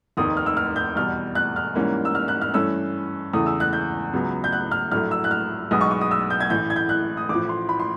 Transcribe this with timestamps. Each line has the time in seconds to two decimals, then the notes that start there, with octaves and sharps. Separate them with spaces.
0.17 F1 D#2 D#3 D#6
0.37 F6
0.46 E6
0.57 F6
0.76 G6
0.96 E2 B2 G3 F6
1.35 F#6
1.56 F6
1.75 G#2 E3 G3 A#3 C#4
2.05 E6
2.15 F6
2.28 F#6
2.41 F6
2.54 G2 E3 A3 C#4 E6
3.33 E2 C#3 E3 A3 D#6
3.46 E6
3.60 F#6
3.73 G6
4.13 C#2 C#3 F#3 B3
4.44 G6
4.53 F#6
4.71 F6
4.92 A#1 A2 F#3 A3 F6
5.11 E6
5.24 F#6
5.31 F6
5.71 B1 B2 G#3 B3 D#6
5.81 C#6
5.91 C#6
6.01 D#6
6.11 E6
6.30 G6
6.40 G#6
6.50 A1 A2 E3 G6
6.70 G#6
6.76 G6
6.89 F#6
7.17 D#6
7.29 A1 A2 F3 D6
7.49 C6
7.69 B5
7.79 C6